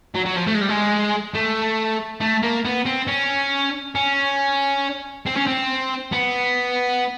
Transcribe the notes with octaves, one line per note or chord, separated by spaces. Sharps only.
F#3
F#3
F3
A3
G#3
G3
G#3
A3
A3
A#3
B3
C4
C#4
C#4
C4
C#4
C4
B3